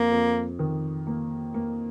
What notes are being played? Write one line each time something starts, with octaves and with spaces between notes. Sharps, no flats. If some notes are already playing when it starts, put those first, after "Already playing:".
Already playing: F2 A#3
F2
D#3
A#3
A#3